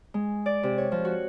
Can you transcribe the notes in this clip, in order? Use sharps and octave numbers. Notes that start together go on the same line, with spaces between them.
G#3
D5
C3
C#5
F3
F#4